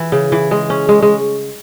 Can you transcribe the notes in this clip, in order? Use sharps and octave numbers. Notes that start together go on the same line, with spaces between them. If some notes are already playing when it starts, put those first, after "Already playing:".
Already playing: E3
C#3
E3
G#3
C#4
G#3
G#3